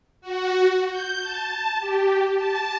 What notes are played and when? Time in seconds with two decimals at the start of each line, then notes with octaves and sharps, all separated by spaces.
0.21 F#4
0.89 G6
1.21 A5
1.80 G4
2.36 A5